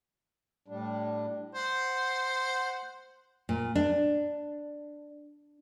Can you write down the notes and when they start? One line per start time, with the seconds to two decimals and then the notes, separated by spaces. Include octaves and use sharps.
0.68 A2 G3 D4
1.55 C5 F#5
3.49 A#2
3.75 D4